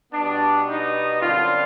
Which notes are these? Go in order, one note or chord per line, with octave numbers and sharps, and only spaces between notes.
B2 G3 B3 D4
D#4
F#2 D3 G3 C4 F4